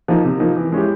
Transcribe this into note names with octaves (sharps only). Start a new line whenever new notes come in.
F3 A#3 D#4
C3
F3 A#3 D#4
E3
G#3 C#4 E4 G4